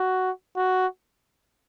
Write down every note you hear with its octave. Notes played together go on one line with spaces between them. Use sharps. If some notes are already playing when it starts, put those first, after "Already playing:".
Already playing: F#4
F#4